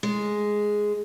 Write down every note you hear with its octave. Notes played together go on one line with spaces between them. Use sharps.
G#3